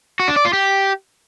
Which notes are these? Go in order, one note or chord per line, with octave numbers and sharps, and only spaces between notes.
F#4
D4
D5
F4
G4